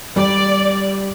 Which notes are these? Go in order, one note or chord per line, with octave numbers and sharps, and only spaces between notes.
G3 D5